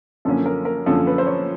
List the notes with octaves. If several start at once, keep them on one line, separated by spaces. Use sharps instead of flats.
F#2 D3 F3 A#3 C#4 A4
A#4
A#4
F#2 D3 F3 A#3 C#4 A4
B4
C5
C#5